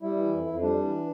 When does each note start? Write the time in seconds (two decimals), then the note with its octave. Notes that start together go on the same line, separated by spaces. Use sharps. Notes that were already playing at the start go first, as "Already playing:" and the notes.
0.01 G3 E4
0.16 E3
0.31 F2
0.47 F2
0.62 G3 D4
0.77 E3